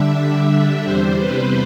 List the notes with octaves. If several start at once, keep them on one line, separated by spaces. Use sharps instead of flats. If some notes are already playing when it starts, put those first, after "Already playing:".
Already playing: D3 G3 D4 E5
E2 C3 G3 C5
B4